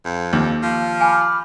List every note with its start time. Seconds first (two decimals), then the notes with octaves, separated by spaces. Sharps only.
0.05 F2
0.33 D#2
0.63 F3
1.01 G#5 B5 D6 F6